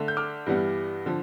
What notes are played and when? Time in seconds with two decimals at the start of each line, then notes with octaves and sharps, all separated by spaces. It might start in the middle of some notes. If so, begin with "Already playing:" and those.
Already playing: D3 A3 D4
0.08 G6
0.17 D6 F6
0.46 G2 E3 G3 B3
1.06 D3 F3